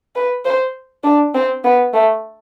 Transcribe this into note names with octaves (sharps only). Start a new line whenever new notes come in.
B4
C5
D4
C4
B3
A3